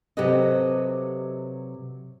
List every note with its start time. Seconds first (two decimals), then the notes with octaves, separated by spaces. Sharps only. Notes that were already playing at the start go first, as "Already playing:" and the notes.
0.17 C3 F#3 G4 A4 B4 D#5